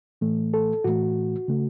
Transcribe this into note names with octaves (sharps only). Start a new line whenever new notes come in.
A2 E3 A3
A4
A2 E3 A3 F#4
C#3 A3